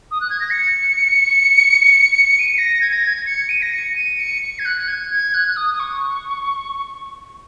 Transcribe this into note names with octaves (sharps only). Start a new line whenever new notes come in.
D#6
F#6
G#6
A#6
C#7
D#7
C#7
A#6
G#6
A#6
G#6
C#7
D#7
A#6
C#7
D#7
C#7
C#7
G#6
F#6
G#6
G#6
F#6
F#6
D#6
D#6
C#6